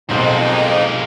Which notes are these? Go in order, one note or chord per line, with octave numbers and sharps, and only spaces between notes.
B1 F2 G#3 A#3 D#4 C5